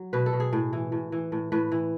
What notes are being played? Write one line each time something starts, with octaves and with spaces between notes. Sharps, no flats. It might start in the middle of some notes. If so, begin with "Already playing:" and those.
Already playing: F#3
B2 B4
A4
B2
G#4
A2
E3
A2
E3
A2
A2 B4
E3